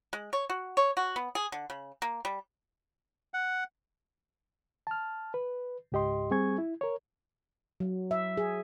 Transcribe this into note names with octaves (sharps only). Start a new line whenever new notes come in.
G#3
C#5
F#4
C#5
F#4
B3
G#4
D3
C#3
A#3
G3
F#5
A5 F6
B4
C#2 G#2 G4 D#5 C6
G3 C4 G#4 G#5 C#6 G#6
E4
A#4 C#5
F#3
E5
G#4